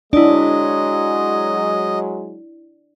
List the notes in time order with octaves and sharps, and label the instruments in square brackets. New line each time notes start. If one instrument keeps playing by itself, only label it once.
[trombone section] F#3 G#3 [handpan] D4 [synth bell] E4 D5 [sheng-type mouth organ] D#5